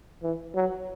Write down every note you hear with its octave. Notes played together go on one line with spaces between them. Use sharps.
E3
F#3